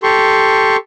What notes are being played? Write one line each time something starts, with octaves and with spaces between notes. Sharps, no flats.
G4 A4 C6 C#6